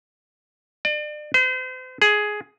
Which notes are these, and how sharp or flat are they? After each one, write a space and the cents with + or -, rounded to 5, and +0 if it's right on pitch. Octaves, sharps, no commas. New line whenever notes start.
D5 +35
C5 -40
G#4 +10